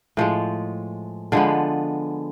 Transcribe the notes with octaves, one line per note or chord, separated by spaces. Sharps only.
A2 F3 G#3
D3 F3 G#3 B3